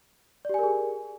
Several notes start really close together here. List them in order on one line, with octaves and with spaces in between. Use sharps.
D5 G4 G#5 A#4 G#4